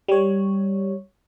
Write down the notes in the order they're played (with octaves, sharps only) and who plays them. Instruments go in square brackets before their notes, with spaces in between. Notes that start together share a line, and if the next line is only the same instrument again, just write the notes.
[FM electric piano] G3 C#5